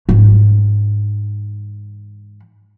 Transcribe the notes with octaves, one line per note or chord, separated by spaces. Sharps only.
G#2 E3